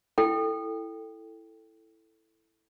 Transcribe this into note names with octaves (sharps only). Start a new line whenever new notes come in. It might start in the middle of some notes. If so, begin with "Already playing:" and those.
E4 A4 G5